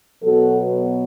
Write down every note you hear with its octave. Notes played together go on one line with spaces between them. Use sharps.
B2 F#3 B3 F#4 A4